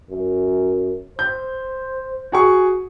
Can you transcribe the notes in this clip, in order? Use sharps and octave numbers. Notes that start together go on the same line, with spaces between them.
F#2
C5 G6
F#4 G#4 C#6